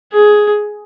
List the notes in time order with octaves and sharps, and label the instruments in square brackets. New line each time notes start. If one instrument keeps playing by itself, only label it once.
[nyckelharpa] G#4